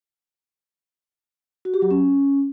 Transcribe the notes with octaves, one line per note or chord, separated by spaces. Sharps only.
F#4
G4
F#3
C#4